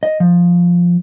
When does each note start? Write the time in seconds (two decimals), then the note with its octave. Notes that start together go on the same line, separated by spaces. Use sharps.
0.03 D#5
0.20 F3